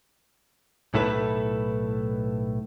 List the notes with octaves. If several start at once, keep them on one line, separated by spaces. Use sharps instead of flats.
B1 A2 E4 A4 B4